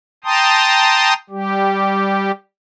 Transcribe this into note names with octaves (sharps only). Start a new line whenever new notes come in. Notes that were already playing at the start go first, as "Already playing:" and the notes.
G5 A5 A#5 C6 D#6
G3 G4